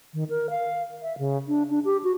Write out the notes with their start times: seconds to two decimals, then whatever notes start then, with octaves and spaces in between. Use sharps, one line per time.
0.14 D#3
0.30 A#4
0.50 F5
1.02 E5
1.18 C#3
1.48 D4
1.71 D4
1.85 G4
2.04 F#4